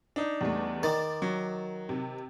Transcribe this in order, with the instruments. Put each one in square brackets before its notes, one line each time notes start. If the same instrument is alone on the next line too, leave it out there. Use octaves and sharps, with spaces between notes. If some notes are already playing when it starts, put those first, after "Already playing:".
[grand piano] D4 D#4
[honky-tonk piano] E2 G3 A3
[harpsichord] D#3 [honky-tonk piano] D6 A6
[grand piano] F#3
[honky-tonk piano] C3